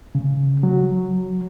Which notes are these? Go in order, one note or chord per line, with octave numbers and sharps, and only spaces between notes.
C#3
F#3